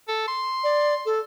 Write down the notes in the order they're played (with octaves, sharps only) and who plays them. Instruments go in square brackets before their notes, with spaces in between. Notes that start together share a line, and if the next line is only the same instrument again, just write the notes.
[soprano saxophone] A4
C6
[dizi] D5
A4